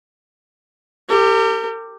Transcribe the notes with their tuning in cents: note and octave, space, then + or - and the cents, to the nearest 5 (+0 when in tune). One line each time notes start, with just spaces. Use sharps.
G4 +5 A#4 -40